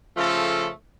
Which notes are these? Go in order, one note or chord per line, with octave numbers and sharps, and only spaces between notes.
C#3 F3 A3 F4 A4